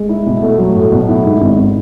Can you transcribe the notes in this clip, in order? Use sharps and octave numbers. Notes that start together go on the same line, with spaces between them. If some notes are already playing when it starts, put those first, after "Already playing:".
Already playing: G#3
E4
B2
A3
F#3
A2
B2
E4
G#2
G#1